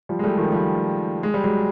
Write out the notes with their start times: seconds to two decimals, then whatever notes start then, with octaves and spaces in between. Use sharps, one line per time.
0.09 F3 G3
0.19 G#3
0.24 G3 A3
0.37 D#3 F3
0.52 F3 G3
1.23 G#3
1.34 G3
1.44 F#3 G#3